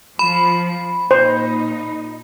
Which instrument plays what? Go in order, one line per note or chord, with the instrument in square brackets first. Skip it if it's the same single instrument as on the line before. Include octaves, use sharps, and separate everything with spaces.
[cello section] F3 [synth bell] B5
[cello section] A#2 D#4 [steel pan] C5